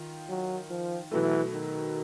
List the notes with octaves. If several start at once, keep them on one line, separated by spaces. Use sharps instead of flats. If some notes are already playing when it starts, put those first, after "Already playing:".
Already playing: D#3 F4
F#3
F3
B2 E3 F#3 A3
D#3